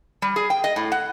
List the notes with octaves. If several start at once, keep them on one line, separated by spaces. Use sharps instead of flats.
G3
G#4
G5
D#5
A2
F#5